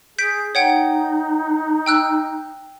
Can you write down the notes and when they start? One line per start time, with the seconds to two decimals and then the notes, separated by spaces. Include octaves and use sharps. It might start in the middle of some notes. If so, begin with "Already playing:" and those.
0.18 G#4 G6 B6 D7
0.55 D#4 C#5 F#5 G5
1.86 G5 E6 F#6